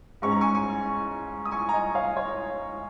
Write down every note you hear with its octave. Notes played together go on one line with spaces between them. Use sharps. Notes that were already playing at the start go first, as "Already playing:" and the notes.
G#2 G#3 C#4 C#6
A#5
G#5 C#6
G#5 C#6
D#6
G#5 C#6
A#5
D#5 G#5
C#5 F5
C#5